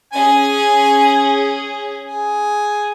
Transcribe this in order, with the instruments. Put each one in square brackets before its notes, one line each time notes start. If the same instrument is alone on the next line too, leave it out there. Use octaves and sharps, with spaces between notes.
[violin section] C#4 G#4 [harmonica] G#5
[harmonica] G#4